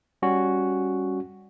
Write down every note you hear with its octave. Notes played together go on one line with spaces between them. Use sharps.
G3 C#4 F#4